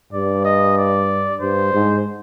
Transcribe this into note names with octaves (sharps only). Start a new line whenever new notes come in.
G2 D5
D#5
D5
G2 C5
G#2